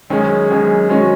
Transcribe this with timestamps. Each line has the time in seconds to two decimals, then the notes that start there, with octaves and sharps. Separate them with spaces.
0.10 F#2 D#3 G#3 C#4 G#4
0.50 F#2 D#3 G#3 C#4
0.89 D#3 G#3 C#4 F#4